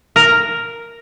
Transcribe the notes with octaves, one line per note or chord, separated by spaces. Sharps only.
A#4